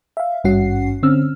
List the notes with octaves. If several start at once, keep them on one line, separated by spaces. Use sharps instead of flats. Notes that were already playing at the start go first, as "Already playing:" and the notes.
E5 F5
G#1 G2 C#4 F#4 F#5 C7
D3 C4 C#4 E6 F6